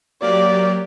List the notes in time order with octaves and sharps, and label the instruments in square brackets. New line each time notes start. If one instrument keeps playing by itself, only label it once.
[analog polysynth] F#3 A#3 G4 [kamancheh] D5